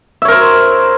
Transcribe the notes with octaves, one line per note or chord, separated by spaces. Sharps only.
A#4 C5 C#5 E5